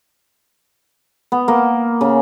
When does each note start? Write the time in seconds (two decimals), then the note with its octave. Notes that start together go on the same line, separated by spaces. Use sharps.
1.32 B3
1.48 A#3
2.01 C#3